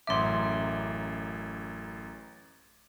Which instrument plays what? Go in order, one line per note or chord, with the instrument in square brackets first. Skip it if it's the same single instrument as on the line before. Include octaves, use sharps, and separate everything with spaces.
[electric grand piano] A1 F#2 D6 [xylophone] E5 C6